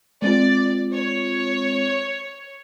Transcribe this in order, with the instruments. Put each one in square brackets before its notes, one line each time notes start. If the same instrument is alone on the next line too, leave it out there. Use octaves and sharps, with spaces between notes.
[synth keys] G#3 C4 F4 [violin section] D5
[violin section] C#5